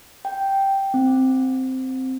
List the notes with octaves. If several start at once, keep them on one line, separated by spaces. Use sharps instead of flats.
G5
C4